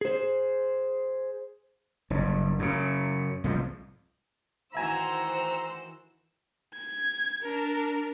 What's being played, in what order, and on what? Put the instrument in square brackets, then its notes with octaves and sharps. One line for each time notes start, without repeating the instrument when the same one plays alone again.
[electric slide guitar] G#4 C5
[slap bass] F#1 G2
F#2 C#3
C2 G#2 F3
[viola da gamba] D#3 E3 F#4 [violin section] C5 E6 [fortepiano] E5 G#5 [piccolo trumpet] A#5
[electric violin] G#6
D4 A#4